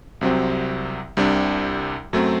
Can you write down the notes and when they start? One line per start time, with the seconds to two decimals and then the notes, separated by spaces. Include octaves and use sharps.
0.21 C2 C3 F#3 C4
1.17 C2 C3 G3 D4 G4
2.13 F#2 F#3 A3 C4